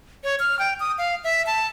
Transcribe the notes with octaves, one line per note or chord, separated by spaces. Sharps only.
C#5
F6
G5
D#6
F5
E5
A5